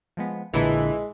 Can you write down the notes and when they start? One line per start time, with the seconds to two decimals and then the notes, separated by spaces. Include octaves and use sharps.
0.17 F3 G#3 B3
0.54 A#1 A#2 D3 E3 G#3 E4 A4 B5